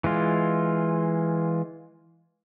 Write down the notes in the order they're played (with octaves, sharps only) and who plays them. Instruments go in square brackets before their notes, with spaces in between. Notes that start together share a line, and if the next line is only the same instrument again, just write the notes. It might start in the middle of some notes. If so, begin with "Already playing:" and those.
[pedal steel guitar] E3 G#3 F4